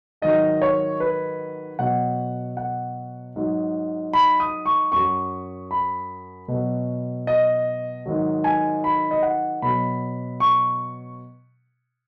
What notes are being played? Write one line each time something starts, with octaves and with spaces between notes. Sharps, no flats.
G#2 D#3 F#3 D#5
C#5
B4
B2 F#3 F#5
F#5
G#2 F#3
B5
D#6
C#6
F#2 F#3 C#6
B5
B2 F#3
D#5
G#2 D#3 F#3
G#5
B5
D#5
F#5
B2 F#3 B5
C#6